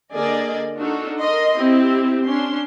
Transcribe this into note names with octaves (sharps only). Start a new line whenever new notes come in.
D3 A#3 G#4 D5 D#5
D4 D#4 F4 F#4 A4
A#4 D#5 C6
C4 E4 G4
C#4 D4 C6